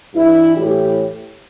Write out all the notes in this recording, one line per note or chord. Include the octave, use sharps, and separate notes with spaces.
G2 E3 E4
A2 E3 G4